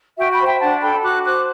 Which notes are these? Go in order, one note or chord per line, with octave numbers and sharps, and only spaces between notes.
F#4 E5 G5
G5 B5
C5
E5 G5
D4 F#5 A5
A4 G5 B5
F#4 D6 F#6
C5 D6 F#6